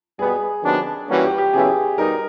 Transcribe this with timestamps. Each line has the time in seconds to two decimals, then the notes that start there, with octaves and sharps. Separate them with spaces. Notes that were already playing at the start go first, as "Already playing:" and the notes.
0.18 B2 G3 B3 G#4
0.63 C3 D#3 F#3 B3 D4
1.09 E3 G3 A#3 C#4 F#4
1.23 G4
1.38 G4
1.53 E2 C#3 F#3 B3 E4 G#4
1.98 B2 G3 D#4 A#4